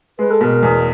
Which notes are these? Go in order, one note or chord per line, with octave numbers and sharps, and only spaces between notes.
G#3 B4
A4
B2 A#4
E2